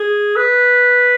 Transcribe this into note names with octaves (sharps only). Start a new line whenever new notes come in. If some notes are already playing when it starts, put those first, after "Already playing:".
Already playing: G#4
B4